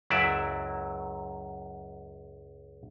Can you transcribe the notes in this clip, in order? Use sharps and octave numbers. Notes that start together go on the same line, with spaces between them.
C#2 F#2 F#3 E4 D5 E5